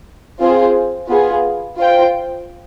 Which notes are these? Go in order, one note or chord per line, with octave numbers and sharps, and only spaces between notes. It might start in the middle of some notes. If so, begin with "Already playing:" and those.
C4 F4 G#4 C5
B3 F4 G#4
F4 C5 G5